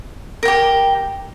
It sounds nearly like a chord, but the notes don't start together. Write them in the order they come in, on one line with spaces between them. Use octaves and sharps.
A#4 G5 G4